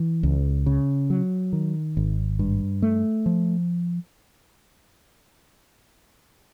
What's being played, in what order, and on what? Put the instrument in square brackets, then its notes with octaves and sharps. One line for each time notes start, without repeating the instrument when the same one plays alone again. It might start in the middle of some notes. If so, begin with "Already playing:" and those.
Already playing: [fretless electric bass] E3
C#2
C#3
F#3
D#3
G#1
G2
A3
F3